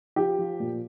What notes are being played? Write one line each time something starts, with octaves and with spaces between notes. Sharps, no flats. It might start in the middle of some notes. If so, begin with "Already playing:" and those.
F3 G4
F3
A#2